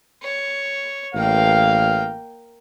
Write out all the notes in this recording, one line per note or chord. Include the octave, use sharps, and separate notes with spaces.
C#5
A1 A#3 F5 G5